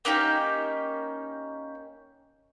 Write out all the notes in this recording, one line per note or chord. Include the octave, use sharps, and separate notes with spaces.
A#3 C#4 D#4 G4